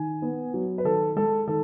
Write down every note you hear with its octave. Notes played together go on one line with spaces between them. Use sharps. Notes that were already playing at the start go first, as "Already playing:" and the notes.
Already playing: D#3 G#5
B3
F#3
B4
D#3 A4
G#3 A4
D#3 A4